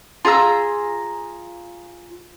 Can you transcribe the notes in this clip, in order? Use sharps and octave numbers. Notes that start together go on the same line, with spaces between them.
F4 G#4 A#5 E6